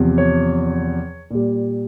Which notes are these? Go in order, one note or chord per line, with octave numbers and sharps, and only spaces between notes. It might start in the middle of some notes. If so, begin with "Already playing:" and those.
Already playing: E2 C3 F3
C#5
A#2 G3